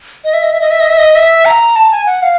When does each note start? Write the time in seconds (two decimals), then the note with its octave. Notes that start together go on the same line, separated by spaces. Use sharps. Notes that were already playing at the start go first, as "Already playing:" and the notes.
0.24 D#5
0.34 E5
0.43 D#5
0.53 E5
0.61 D#5
0.71 E5
0.80 D#5
0.89 E5
0.98 D#5
1.15 E5
1.45 A#5
1.76 A5
1.91 G#5
2.06 F#5
2.23 F5